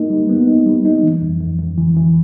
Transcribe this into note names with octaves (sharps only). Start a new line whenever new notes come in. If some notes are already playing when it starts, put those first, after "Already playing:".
Already playing: A#3 D#4
G3
B3
D#4
G3
D#4
E3
F2
F2
F2
E3
E3